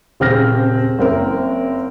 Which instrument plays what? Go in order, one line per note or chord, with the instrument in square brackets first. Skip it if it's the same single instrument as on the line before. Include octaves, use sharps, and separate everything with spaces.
[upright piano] D#1 C#3 C4 C5 F6 A#6
F#1 C4 A#4